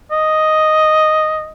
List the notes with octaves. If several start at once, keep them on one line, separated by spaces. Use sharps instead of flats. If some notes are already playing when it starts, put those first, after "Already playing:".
D#5